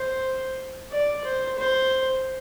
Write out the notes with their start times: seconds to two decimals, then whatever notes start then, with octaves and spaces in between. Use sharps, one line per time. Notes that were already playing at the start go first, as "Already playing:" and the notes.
Already playing: C5
0.92 D5
1.25 C5
1.58 C5